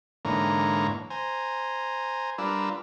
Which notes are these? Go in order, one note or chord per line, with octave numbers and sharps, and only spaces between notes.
G#2 D3 E3 A#3 C#5 A#5
C5 G#5 A#5
G3 D4 F4 A#4 B4 E6